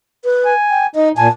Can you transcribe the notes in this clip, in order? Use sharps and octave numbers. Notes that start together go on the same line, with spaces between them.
B4
G#5
G5
D#4 D#5
A#2 G#5 A5